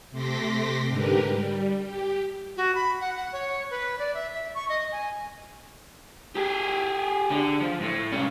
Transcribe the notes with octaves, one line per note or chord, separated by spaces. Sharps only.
C3 A3 C6 D6 A#6 B6
G#2 D3 G4 A#4 B4
G3
G4
F#4
B5
F#5
F#5
C#5
B4
D5
E5
E5
C#6
D#5
G#5
G4 G#4
D3
F3
A2
C2 C#4